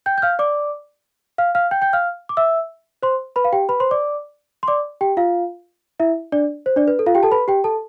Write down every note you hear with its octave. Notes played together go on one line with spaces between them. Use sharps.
G5 G6
G6
F5 F6
D5 D6
F5 F6
F5 F6
G5 G6
G5 G6
F5 F6
D6
E5 E6
C5 C6
B4 B5
F5
G4 G5
B4 B5
C5 C6
D5 D6
C6
D5 D6
G4 G5
F4 F5
E4 E5
D4 D5
C5
D4 D5
B4
A4
F4 F5
G4 G5
A4 A5
B4 B5
G4 G5
A4 A5